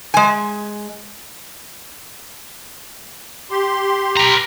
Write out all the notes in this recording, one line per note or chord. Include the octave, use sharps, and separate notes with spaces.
G#3 G#5
G4 C6
B4 A#5